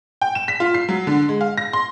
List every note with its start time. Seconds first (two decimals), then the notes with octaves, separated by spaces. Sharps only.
0.21 G5
0.35 E7
0.48 B6
0.60 F4
0.74 C7
0.89 F#3
1.07 D3
1.29 G#3
1.41 F5
1.58 A#6
1.73 C6